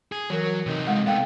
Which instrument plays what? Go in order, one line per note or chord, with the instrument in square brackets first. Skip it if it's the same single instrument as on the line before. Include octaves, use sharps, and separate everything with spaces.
[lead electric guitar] G#4
[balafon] E3 A#4 [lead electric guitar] F#3
[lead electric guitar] C3 D#4
[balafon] G#3 F#5
[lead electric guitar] A3 B3 [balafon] F5 G5